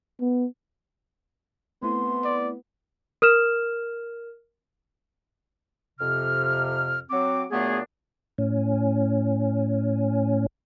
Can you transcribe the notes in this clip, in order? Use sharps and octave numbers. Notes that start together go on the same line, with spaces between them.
B3
A3 B3 C4 E4 C6
D5
A#4 F6 E7
F2 C3 F6
F#3 C4 D6
A#2 F#3 A3 B3 D4 G#4
A2 C#4